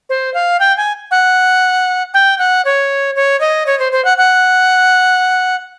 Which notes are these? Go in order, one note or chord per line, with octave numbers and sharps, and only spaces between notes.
C5
F5
G5
G#5
F#5
G5
F#5
C#5
C#5
D#5
C#5
C5
C5
F#5
F#5